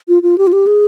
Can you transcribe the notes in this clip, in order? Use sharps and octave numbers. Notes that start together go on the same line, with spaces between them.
F4
F4
G4
F4
G4
G#4